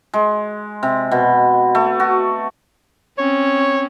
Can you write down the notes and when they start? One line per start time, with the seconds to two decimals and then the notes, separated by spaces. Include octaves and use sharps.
0.14 G#3
0.83 C3
1.11 B2
1.75 A3
2.00 F#4
3.18 C4 C#4 C#5